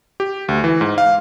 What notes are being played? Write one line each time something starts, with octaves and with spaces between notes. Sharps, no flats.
G4
D2
E3
G#2
F5